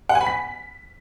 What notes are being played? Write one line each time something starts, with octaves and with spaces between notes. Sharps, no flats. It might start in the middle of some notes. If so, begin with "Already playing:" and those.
F#5
G#5
B5
B6